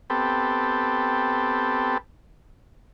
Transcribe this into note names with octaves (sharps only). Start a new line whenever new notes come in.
B3 C4 G4 A4